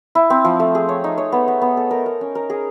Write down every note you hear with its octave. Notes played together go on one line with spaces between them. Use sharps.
E4
C4
F3
A3
G#4
C#5
D#4
C#5
B3
B3
B3
A4
A#4
A#4
C#4
A#4
G#4